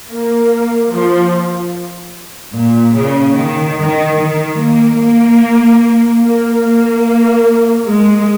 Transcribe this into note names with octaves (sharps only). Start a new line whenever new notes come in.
A#3
F3
A#2
C#3
D#3
D#3
D#3
A#3
A#3
A#3
A#3
G#3